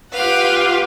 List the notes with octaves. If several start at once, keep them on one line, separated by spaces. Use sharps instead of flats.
F4 G4 B4 F5 F#5